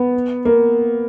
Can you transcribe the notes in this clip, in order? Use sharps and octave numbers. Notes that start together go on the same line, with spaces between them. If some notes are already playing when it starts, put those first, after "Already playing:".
Already playing: B3
A#3